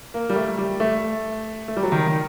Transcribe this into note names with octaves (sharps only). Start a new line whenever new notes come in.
A#3
G3
A3
G3
A3
A3
G3
F#3
D#3
D#3